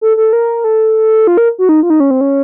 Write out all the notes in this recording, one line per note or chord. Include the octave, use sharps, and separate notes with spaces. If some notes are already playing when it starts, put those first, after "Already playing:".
A4
A4
A#4
A4
F4
A#4
F#4
D#4
F4
D#4
C#4
C4
C#4